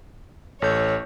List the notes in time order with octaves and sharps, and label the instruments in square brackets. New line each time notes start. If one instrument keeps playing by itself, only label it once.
[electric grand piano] A1 A4 G6 [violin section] C#5